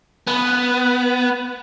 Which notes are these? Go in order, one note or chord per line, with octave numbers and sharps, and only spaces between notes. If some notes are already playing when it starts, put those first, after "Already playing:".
B3